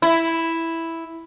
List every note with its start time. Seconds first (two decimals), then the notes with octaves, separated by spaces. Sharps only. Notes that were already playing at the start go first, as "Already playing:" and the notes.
0.02 E4